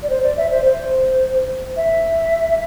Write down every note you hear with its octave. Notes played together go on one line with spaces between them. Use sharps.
D5
C5
D5
E5
C5
C5
E5